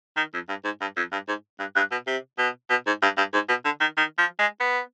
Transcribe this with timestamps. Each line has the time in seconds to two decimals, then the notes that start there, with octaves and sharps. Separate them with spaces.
0.17 D#3
0.34 F2
0.49 G2
0.64 G#2
0.81 G2
0.97 F2
1.12 G2
1.28 G#2
1.59 G2
1.76 G2
1.91 B2
2.07 C3
2.38 B2
2.70 B2
2.87 G#2
3.02 G2
3.17 G2
3.33 G#2
3.49 B2
3.65 D3
3.80 D#3
3.97 D#3
4.18 F3
4.39 G#3
4.60 B3